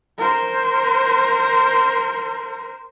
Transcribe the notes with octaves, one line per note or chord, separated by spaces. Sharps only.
A#4 C5